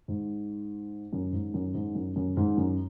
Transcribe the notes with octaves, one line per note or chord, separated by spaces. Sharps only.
G#2
F#2
G#2
F#2
G#2
F#2
F#2
G#2
F#2